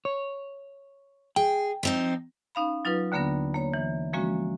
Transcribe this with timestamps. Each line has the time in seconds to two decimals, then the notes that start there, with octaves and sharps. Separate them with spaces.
0.05 C#5
1.36 G#4 G5
1.83 F3 C4 D#4
2.55 C#4 D#4 F5 B5
2.85 F#3 D#4 F4 B4
3.12 D#2 D3 A#3 B3 D4 A#6
3.54 A#3 C#5
3.74 E3
4.13 F3 G#3 A#3 C#4 F#4